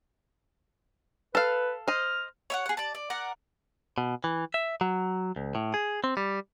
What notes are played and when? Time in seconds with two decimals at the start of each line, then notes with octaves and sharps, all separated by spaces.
1.35 A4 B4 F5
1.88 C5 D#5 F6
2.50 C#5 E5 F#5
2.66 G#4 F#5
2.77 D5 A5
2.95 D5
3.10 A#4 D5 F#5
3.98 B2
4.24 E3
4.54 E5
4.81 F#3
5.36 C#2
5.55 A2
5.74 G#4
6.04 C4
6.17 G3